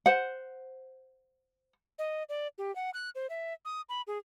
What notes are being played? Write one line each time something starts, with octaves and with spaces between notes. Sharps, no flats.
C5 F#5
D#5
D5
G4
F#5
F#6
C5
E5
D#6
B5
G#4